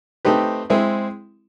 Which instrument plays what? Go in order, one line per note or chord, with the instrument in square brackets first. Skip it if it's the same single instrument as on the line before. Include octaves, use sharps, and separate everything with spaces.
[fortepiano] A3 C4 D#4 G4 B4
G#3 C4 E4 G#4